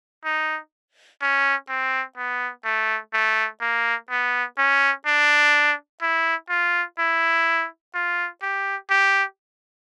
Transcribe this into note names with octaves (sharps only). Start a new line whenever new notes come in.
D#4
C#4
C4
B3
A3
A3
A#3
B3
C#4
D4
E4
F4
E4
F4
G4
G4